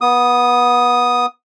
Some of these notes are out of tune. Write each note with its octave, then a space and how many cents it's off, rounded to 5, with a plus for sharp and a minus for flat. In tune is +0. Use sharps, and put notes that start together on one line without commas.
B3 -20 D#6 +0